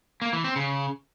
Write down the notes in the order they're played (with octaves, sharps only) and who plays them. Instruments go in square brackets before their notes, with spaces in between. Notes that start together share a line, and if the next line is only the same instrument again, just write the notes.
[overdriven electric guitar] A#3
E3
C4
C#3